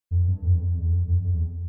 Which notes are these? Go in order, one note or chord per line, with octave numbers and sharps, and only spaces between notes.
F2
G2
F2
E2
F2
E2
F2
F2
F2
E2